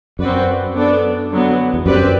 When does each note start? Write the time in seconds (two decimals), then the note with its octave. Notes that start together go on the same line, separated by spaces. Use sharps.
0.19 F#2 C4 F#4 B4 D5
0.75 B3 D4 A4 D5
1.31 D3 F#3 B3
1.74 E2
1.86 F#2 C4 G4 B4 D5